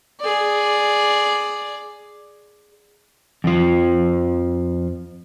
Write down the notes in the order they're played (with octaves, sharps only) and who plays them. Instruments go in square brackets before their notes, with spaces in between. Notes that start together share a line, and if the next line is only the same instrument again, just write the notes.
[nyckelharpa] G#4 D5
[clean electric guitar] F2 F3